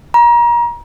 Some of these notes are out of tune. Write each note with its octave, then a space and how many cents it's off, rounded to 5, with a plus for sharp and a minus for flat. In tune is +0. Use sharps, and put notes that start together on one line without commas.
A#5 +30